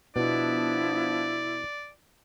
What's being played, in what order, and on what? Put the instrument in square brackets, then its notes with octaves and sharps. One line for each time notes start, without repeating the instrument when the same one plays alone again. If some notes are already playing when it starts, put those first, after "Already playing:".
[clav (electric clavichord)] B2 [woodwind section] F3 B3 D4 [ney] E4 [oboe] D5